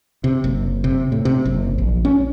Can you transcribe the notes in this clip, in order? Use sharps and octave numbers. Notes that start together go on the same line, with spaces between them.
C3
F#1
C3
A2
C3
F#1
A#1
C#4